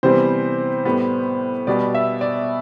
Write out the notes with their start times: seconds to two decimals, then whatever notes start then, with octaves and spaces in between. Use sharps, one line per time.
0.03 C3 E3 G3 B3 C5
0.85 A2 G3 B3
1.67 B2 G3 B3 D5
1.94 E5
2.21 D5